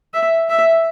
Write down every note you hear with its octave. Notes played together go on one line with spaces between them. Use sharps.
E5
E5